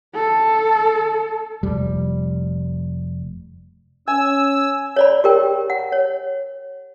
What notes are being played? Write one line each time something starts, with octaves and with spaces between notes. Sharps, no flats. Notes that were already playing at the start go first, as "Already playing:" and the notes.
A4
F1 G3
C#4 G#5 E6
C#5 D5 B5
G4 A#4 G5
F#5
C#5